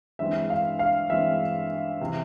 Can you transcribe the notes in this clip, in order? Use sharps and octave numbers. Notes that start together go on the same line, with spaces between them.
G2 E3 G#3 C4 E5
F5
F5
G2 E3 G#3 C4 E5
C3 E3